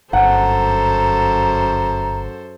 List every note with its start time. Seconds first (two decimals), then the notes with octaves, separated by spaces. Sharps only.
0.13 G1 F#2 A4 C5 F#5 A#5